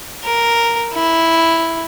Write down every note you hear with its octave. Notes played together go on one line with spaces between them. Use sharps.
A#4
E4